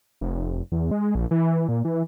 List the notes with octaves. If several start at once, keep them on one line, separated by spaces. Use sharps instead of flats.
F1
E2
G#3
A#1
E3
A#2
E3